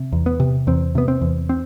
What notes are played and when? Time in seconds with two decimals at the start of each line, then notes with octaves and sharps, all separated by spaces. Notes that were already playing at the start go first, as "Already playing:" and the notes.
Already playing: C3
0.12 E2
0.26 B3
0.40 C3
0.67 E2 C4
0.95 C3 B3
1.08 C4
1.21 E2
1.49 C4